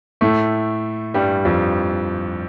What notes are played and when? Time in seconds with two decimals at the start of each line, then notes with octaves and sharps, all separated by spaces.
0.21 A2 A3
1.14 G2 G3
1.45 F2 F3